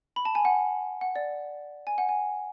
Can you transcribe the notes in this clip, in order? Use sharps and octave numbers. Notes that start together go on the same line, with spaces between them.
B5
A5
G#5
F#5
F#5
D5
G#5
F#5
G#5